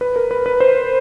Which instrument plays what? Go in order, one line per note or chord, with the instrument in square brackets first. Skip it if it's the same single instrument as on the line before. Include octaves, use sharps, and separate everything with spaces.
[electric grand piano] B4
A#4
B4
B4
C5